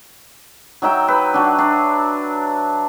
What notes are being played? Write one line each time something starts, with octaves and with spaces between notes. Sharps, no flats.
F#3 D#4 E5 G5
B4
F#3 D4
D4